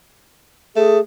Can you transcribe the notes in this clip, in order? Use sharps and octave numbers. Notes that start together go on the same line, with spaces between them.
A3 G#4